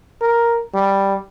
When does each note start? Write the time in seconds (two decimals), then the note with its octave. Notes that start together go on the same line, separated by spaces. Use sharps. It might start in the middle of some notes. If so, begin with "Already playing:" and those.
0.22 A#4
0.74 G3